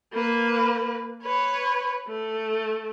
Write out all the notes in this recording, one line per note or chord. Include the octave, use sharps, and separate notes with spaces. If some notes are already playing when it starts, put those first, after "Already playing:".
A#3 B4
B4 C#5
A3